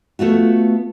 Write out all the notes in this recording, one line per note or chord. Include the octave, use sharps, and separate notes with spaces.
A3 B3 F4 F#4